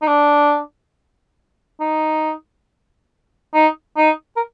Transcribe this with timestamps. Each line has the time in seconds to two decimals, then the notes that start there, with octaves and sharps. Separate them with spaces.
0.02 D#4
0.07 D4
1.80 D#4
3.54 D#4
3.97 D#4
4.36 A#4